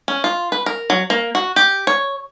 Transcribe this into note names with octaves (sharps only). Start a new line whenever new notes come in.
C#4
F4
B4
A#4
F#3
A#3
F#4
G4
C#5